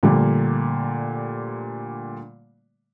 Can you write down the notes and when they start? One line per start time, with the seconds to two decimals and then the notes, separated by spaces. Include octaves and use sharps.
0.03 A#2 D3 F3 G3 A3